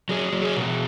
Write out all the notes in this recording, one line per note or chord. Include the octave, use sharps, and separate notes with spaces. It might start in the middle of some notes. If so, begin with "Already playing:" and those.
F#3 G#4
F#3
G#4
B2